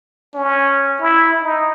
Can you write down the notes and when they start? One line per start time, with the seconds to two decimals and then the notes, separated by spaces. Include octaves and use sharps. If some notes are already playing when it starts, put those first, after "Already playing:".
0.35 C#4
1.00 E4
1.42 D#4